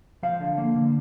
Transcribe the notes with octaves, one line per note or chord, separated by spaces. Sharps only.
F3 F5
D3
A#3
D3